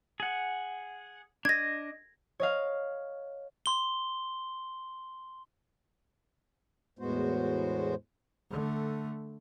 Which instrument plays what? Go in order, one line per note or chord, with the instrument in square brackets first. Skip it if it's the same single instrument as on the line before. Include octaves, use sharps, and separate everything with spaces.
[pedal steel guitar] G#4 F#5
[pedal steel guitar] D4 D#5 [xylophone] G#6 A#6
[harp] C#5 D#5 F5
[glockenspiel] C6 G7
[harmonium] E2 A2 G#3 B3 F#4 C5
[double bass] D3 A3